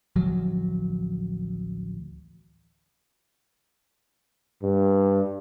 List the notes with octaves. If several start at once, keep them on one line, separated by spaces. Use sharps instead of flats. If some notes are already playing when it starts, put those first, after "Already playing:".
A1 D2 F3 F#3
G2